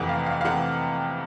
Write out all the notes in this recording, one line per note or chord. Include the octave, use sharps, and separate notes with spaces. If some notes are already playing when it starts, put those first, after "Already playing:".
Already playing: F2 C3 E3 A3 F#5
F5
F5
F5
C3 E3 A3 F#5